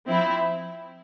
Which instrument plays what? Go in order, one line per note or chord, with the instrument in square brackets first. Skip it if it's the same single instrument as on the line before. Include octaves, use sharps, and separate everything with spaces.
[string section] F3 C4 E4